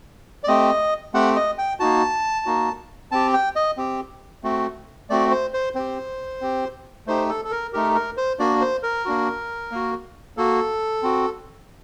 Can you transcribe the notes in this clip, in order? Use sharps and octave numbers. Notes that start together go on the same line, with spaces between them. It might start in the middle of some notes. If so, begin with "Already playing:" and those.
D5
A3 C4 G4 D#5
A3 C4 G4 F#5
D#5
G5
A#3 D#4 F#4 A5
A#3 D#4 F#4
C4 G4 A5
G5
D#5
C4 G4
A3 C4 F#4
A3 C4 F#4 D5
C5
C5
C4 G4 C5
C4 G4
A3 D#4 G4 C5
A4
A4
A#4
A3 D#4 G4 A#4
A#4
C5
A#3 D4 F#4 D5
C5
A#4
A#3 D4 F#4
A#3 F#4
A#3 F#4 A4
C4 F#4